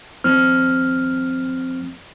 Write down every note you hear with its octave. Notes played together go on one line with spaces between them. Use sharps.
D#2 F3 C4 F6